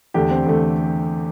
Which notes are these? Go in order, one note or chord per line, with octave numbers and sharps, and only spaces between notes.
E2 D3 A3 G4
C4
E2 D3 A3